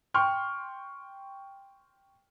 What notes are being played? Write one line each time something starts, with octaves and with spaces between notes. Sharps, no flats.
G5 C6 C#6 F6